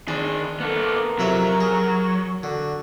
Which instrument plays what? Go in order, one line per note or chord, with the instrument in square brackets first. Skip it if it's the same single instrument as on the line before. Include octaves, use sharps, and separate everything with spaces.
[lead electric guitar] D#3 G#4 [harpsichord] D4
[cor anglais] A#3 [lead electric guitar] B3 A4
[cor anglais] A#4
[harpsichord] F2 C3 E5 [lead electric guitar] F#3
[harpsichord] G#4
[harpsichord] D3 [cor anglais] F#4